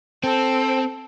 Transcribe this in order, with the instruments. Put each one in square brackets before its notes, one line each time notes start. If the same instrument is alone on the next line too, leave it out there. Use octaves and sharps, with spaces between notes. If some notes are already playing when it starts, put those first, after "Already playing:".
[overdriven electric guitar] C4 [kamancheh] A4